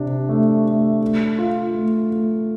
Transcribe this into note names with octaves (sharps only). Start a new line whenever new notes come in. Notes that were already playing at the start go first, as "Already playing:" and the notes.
Already playing: C3 D4
A3
A3
A3
F4
A3
A3